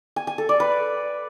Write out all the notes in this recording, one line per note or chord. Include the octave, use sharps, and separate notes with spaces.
G#5
G#5
A4
D5
B4